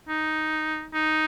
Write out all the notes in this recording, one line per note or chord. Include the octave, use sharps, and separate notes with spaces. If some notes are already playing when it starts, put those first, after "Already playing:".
D#4
D#4